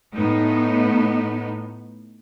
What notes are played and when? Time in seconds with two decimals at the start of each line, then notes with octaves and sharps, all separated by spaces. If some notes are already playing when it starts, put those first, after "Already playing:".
0.14 A2 B3 D#4